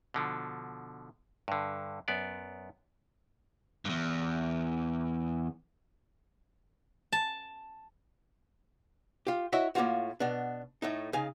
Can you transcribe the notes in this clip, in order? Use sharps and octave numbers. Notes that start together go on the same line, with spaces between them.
B2 D3 F3
G2 D3
F#2 B3 D5
E2 G2
A5
F4 G4
E4 F#4 C#5 D#5 E5
A2 A#3 C4 F4 F#4
B2 B3 D4
A2 A3 D#4
C#3 D#4 F5 G#5